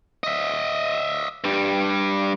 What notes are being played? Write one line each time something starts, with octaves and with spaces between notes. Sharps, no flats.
D#5 E5
G2 G3